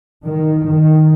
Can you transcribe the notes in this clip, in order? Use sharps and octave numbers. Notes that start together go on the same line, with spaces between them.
D#3
D#3